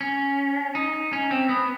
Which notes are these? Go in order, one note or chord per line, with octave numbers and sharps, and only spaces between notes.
C#4
D#4
C#4
C4
B3